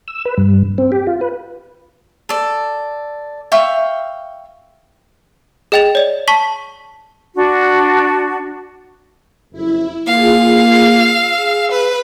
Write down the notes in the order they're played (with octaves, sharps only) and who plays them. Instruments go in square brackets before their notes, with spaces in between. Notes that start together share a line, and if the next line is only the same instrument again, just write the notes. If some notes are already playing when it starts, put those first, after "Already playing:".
[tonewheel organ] E6
B4
G2
C4
G4
F4
B4
[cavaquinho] A4 D5
E5 F5 G5 C#6
[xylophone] G#4 D#5 G5 A6 F7
C#5 D5
A5 C#6 B6 F#7
[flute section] D4 F#4
[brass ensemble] F#1 F2 [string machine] E4
[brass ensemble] A#3 [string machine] F4 G#4 [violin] F5
[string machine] E6
[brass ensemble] G#4
[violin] B4